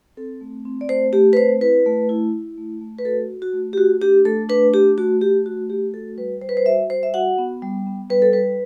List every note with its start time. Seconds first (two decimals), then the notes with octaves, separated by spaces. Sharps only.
0.17 C4 A4
0.41 A3
0.65 C4
0.81 D5
0.89 A3 C5
1.13 A3 G4
1.33 B4
1.37 C4 C5
1.61 E4 B4
1.86 A3
2.09 E4
2.33 E4
2.58 A3
2.81 A3
2.98 B4
3.05 F#4 A4
3.30 F#4
3.42 F#4
3.53 A3
3.73 G4
3.78 A3 F#4
4.01 D4 G4
4.25 A3 A4
4.49 D4 B4
4.74 A3 G4
4.98 A3 F#4
5.21 A3 G4
5.46 F#4
5.70 A3 G4
5.94 F#4 A4
6.17 G3 B4
6.41 G3 C5
6.49 B4
6.57 C5
6.66 F#4 E5
6.90 G3 C5
7.03 E5
7.14 F#4 F#5
7.38 B3
7.62 G3
7.86 B3
8.10 G3 B4
8.22 A4
8.33 G3 B4